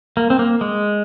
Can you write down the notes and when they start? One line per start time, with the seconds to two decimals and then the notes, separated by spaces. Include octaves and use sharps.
0.17 A#3
0.30 C4
0.39 A#3
0.61 G#3